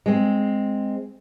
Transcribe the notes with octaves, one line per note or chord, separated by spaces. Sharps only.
G#3 C4